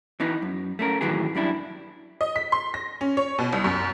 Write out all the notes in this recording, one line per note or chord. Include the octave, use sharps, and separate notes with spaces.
E3 B3 D#4
F#2
A3 C#4 A#4
A2 D#3 E3 F#3 B3 G#4
F#2 G3 D4 E4
D#5
B6
C6
A#6
C#4
C#5
B2
C2
F#2